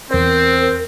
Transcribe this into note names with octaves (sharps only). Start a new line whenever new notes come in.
E2 C4 A#4 C5